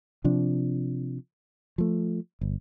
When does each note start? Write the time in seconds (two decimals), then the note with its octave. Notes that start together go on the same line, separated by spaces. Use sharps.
0.24 C3 F3 D4
1.78 F3 A3
2.41 G1